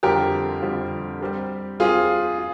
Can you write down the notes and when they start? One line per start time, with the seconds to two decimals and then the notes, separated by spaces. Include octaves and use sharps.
0.03 F2 D3 G3 C4 F4 G4 A#4
0.62 F2 D3 G3 C4 F4
1.21 G3 C4 G4 A#4
1.80 G3 C4 F4 G4 G#4 A#4
2.39 F4